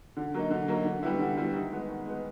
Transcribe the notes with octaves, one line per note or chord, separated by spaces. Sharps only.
D3
F#3 A#3 D#4
D3
F#3 A#3 D#4
D3
G3 B3 E4
D3
G3 B3 E4
D#3
G#3 B3
D#3
G#3 B3